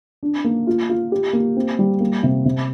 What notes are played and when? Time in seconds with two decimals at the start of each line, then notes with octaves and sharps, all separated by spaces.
0.23 D4
0.44 A#3
0.67 F4
0.89 F4
1.12 G4
1.33 A#3
1.57 C4
1.79 G3
2.00 A#3
2.23 C3
2.45 C3